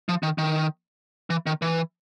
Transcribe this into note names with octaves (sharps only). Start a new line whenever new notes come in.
F3
D#3
D#3
E3
D#3
E3